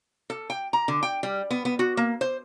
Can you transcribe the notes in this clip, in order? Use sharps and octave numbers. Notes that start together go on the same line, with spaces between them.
A4
G5
A#5
D3
G5
G3
B3
B3
F#4
A#3
C5